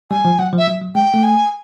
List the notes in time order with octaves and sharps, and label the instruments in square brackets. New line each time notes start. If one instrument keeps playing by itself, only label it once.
[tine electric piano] G3 [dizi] G#5
[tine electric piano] F3
[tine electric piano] F#3 [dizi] F#5
[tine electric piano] F3
[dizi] E5
[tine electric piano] F#3
F#3
[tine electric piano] G#3 [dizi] G5
[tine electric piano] A3
[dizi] G#5